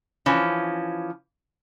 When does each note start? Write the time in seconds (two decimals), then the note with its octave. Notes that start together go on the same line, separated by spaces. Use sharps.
0.26 E3 F3 C#4